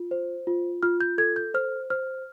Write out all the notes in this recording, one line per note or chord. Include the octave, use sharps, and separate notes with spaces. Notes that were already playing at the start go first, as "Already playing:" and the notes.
Already playing: F4
C5
F4
F4 F6
G6
A4 G#6
G6
C5 F6
C5 F6